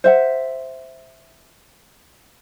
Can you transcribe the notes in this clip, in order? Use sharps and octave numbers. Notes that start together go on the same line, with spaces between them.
C5 E5 F#5